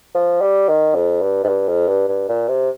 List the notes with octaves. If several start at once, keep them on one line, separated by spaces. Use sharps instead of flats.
F3
G3
D#3
F2
G2
G#2
G2
F2
G2
G2
A#2
C3